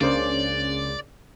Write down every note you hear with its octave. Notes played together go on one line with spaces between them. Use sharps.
C#2 C#3 A#3 D4 C5 D5